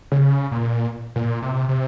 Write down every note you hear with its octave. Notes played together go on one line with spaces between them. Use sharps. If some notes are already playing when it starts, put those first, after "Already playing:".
C#3
A#2
A#2
C3
C3